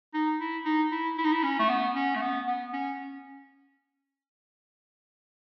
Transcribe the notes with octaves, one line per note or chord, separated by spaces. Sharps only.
D#4
E4
D#4
E4
E4
D#4
E4
C#4
A3
B3
C#4
A3
B3
B3
C#4